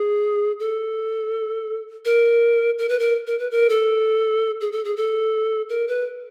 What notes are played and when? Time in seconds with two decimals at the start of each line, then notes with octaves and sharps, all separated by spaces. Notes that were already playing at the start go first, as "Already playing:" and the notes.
Already playing: G#4
0.60 A4
2.05 A#4
2.79 A#4
2.89 B4
2.99 A#4
3.27 A#4
3.39 B4
3.51 A#4
3.70 A4
4.61 G#4
4.72 A4
4.85 G#4
4.96 A4
5.69 A#4
5.88 B4